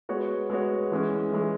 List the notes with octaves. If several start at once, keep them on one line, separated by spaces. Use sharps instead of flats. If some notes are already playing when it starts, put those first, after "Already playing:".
G#3 B3 F#4 C#5
G#3 B3 F#4 C#5
E3 G#3 C#4
E3 G#3 C#4